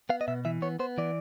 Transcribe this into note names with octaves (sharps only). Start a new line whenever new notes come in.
B3 F5
D#5
B2 E5
E3 E5
B3 C#5
B3 C5
E3 D5